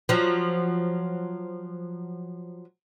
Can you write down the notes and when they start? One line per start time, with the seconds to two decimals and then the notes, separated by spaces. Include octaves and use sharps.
0.09 F3 F#3